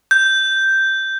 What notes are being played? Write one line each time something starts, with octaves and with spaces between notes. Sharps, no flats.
G6